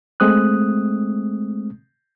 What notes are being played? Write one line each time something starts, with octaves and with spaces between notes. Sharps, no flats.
G#3 A3 C4 D#6 F#6